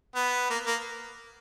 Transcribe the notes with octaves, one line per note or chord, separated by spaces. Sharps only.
B3
A#3
A#3